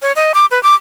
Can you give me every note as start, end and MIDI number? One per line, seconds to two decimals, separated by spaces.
0.02 0.12 73
0.16 0.32 75
0.34 0.46 86
0.51 0.62 71
0.63 0.75 86